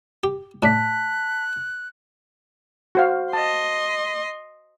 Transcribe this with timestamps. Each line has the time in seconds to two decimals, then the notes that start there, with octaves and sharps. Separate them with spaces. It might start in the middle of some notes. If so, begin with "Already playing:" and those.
0.24 G4
0.63 A2 D4 A5 F#6 B6
2.95 F#4 C5 F5
3.33 D#5 A5 C6